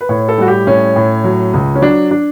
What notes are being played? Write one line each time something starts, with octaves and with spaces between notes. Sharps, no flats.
B4
A2 C#5
A4
G3 F#4
G4
A2 C#4
A2
F#3
C#2
C#4
F#3 D4
D4